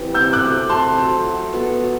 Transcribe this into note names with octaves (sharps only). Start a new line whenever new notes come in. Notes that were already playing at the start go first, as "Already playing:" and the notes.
Already playing: E3 G3 C4 G4
C3 E6 G6
D6 F#6
F#3 A3
C3 A5 C6
F#3 A3
F#3
B3 F#4 A4
F#3